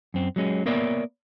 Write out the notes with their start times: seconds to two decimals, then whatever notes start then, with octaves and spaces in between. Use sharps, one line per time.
0.14 F#2 C4
0.36 F#3 G#3 C#4
0.66 A#3 B3 A#4 C#5 D5 E5